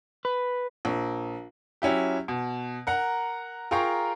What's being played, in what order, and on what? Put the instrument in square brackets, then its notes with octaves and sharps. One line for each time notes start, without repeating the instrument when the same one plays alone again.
[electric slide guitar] B4
[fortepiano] A#1
[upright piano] F#3 C#4 E4 G4
B2
A#4 F#5 A#5
F4 G#4 A#4 G5 A#5 C#6